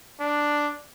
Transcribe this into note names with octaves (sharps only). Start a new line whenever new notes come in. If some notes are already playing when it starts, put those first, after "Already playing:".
D4